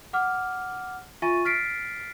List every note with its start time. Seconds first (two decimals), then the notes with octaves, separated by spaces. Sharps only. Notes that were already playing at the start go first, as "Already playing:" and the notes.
0.13 F#5 D6 F6
1.22 F4 E5 G#5 C#6 A6 D#7
1.45 F6 A6 B6 C7 D7